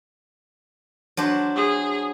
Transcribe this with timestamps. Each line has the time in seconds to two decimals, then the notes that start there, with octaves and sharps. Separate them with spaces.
1.17 F#3 D4 C5
1.56 G#4